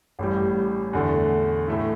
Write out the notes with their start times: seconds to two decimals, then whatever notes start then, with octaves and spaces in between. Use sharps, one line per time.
0.19 A1 A2 G3
0.93 E2 D3 A3
1.68 A2 A3 E4